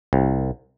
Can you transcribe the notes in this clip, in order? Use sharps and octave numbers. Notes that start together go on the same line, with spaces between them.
C2